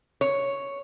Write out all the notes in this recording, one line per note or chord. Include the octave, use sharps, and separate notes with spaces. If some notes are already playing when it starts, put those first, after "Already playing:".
C#5